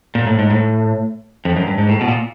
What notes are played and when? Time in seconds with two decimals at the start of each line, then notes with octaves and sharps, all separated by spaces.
0.15 A#2
0.27 A2
0.39 G#2
0.50 A2
1.45 F2
1.57 F#2
1.67 G2
1.78 G#2
1.89 A2
2.01 B2
2.08 A#2